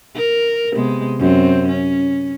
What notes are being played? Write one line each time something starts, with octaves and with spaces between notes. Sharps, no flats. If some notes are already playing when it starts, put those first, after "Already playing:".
A#4
C3 G#3 B3
F#2 C4
C#4